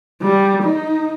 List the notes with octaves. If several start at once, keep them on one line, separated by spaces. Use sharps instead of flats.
G3
D#4